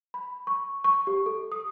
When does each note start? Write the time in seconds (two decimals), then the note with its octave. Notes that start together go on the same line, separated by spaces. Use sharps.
0.14 B5
0.47 C#6
0.84 C#6
1.07 G4
1.26 A4
1.52 D#6